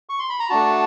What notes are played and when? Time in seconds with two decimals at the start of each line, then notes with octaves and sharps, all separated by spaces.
0.09 C#6
0.19 C6
0.30 B5
0.40 A#5
0.50 A3 D4 F#4 A5